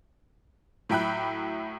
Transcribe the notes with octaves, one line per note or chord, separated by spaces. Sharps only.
A2 F#3 E5 G5 B5 F#6